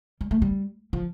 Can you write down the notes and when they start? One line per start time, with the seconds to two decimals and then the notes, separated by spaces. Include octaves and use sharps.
0.21 G3
0.31 A3
0.42 G3
0.93 F3